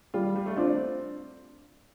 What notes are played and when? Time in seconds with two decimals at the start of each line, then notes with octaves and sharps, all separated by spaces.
0.14 G3 F4
0.36 G3
0.46 A3
0.56 C4 D4 F4 D5